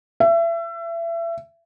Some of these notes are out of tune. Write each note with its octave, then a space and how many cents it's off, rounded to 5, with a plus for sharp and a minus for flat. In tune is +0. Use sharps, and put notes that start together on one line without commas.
E5 +30